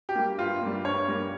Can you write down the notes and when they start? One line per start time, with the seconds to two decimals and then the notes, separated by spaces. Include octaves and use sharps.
0.09 G4
0.15 G3 A#3
0.38 G2 F4
0.62 G3 A#3
0.85 G2 C#5
1.08 G3 A#3